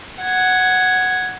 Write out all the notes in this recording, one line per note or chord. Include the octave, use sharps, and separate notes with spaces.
F#5 G#6